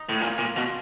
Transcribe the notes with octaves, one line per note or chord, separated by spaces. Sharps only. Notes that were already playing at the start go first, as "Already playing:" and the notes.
Already playing: D#4
A2
A#2 F4
A#2
B2